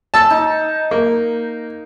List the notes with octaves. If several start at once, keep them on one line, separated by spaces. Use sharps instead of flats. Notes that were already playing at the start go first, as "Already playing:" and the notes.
A5 E6
D#4
A#3